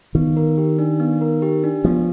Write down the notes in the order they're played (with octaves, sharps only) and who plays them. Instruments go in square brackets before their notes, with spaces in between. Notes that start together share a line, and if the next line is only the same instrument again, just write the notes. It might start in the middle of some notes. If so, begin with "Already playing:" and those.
[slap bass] D#3 [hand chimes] B3
[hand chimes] A#4
G4
D4
B3
A#4
G4
D4
[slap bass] F3 [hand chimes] B3